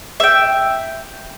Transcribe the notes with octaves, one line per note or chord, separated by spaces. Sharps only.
E5 G5